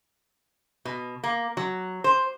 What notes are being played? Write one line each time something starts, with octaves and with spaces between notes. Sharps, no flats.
B2
A#3
F#3
C5